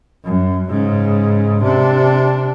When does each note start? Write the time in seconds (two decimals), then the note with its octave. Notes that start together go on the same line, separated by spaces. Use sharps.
0.24 F#2
0.69 G#2 C#3
1.63 C3 D4